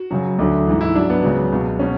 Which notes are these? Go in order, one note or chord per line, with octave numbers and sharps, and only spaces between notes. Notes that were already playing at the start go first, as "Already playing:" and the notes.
Already playing: F#4
F#2 C#3 F#3
D2 D3 F#3
G#2 E3
E4
G#2 F#3 D4
B3
C#2 C#3 F#3
C#2 B2 F#3
B2 F#3 C#4